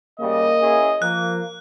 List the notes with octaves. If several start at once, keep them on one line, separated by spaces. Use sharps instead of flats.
C#3 G3 A#3 D#5
C#4 E4 G#4
F3 A#3 F#6